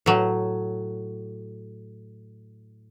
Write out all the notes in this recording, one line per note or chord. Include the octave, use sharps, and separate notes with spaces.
A2 F#3